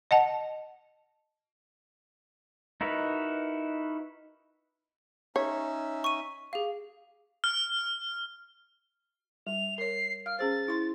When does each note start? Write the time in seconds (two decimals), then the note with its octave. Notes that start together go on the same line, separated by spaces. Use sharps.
0.11 D#5 F#5 A5
2.81 D#4 E4 F#4 A#4 B4
5.36 C#4 D#4 C#5 E5
6.04 C#6 D#7
6.53 G4 G#4 F5
7.44 F6
9.47 G3 F7
9.78 A#4 C#5 C7
10.26 F5 F6
10.39 C#4 G#4 C5 A6
10.68 E4 C6